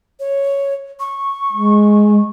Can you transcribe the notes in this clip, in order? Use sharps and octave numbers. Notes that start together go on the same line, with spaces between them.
C#5
C#6
G#3